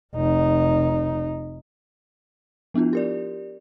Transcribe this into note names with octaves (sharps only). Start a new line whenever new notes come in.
F1 D#4
F3 B3 D4 E4 F4
G4 A#4 D5